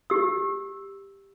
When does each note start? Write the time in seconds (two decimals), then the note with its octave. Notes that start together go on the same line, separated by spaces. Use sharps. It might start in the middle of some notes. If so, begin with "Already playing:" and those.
0.10 G4 E6